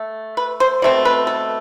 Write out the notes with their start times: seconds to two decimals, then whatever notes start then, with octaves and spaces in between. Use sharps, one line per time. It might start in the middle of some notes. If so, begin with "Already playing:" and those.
Already playing: A3
0.37 B4
0.60 C5
0.82 B2 A3 C4 D5
1.05 B4
1.27 A4